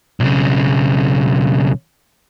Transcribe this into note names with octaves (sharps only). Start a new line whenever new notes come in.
B1 C#3